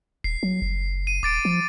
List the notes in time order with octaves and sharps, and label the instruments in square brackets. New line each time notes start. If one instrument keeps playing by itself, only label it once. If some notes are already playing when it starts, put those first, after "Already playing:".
[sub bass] D#1 [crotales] C7
[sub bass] F#3
F#1
[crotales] D#7
[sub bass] D#1 [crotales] D6 A6 D7
[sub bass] F3